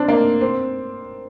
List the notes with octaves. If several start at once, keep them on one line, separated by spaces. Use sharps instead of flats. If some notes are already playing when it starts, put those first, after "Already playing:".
Already playing: C4 D4
A#3
C4